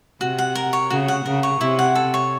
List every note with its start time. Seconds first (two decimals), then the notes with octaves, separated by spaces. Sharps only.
0.21 C3 F#4
0.38 F#5
0.55 A#4
0.73 C#5
0.90 C#3 F#4
1.08 F#5
1.26 C#3 A#4
1.43 C#5
1.60 C3 E4
1.79 F#5
1.95 A4
2.14 C#5